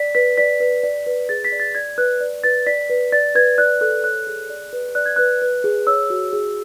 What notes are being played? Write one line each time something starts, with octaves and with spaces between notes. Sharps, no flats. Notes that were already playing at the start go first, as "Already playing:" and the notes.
Already playing: D5 B6
B4 B6
D5 B6
B4
D5
B4
G#4 A6
B6
D5
A6
D5 G#6
B4 F#6
D5
B4 A6
D5 B6
B4
D5 A6
B4 G#6
D5 F#6
A4 F#6
C#5 F#6
G#4
D5
B4
D5 F#6
G#6
B4 F#6
B4
G#4
C#5 E6
F#4
G#4